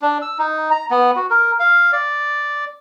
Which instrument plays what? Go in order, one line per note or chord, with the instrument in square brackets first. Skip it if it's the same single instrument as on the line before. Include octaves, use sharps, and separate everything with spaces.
[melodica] D4
E6
D#4
A#5
B3
F#4
A#4
F5
D5